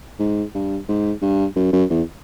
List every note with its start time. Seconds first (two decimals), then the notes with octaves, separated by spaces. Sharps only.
0.19 G#2
0.54 G2
0.88 G#2
1.22 G2
1.56 F#2
1.73 F#2
1.90 E2